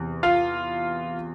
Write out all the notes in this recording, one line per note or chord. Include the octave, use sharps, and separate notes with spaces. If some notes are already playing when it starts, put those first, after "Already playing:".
Already playing: E2 C3 E3
F4 F5